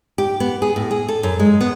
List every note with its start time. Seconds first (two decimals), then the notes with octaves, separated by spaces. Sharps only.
0.18 G4
0.40 B3
0.62 G#4
0.76 A2
0.91 G#4
1.08 A4
1.23 F#2
1.39 G#3
1.61 B3